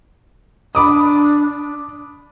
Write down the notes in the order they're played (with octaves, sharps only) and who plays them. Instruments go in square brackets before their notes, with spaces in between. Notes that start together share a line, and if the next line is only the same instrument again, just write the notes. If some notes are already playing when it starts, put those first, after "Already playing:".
[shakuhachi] D4 [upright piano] B5 D6 D#6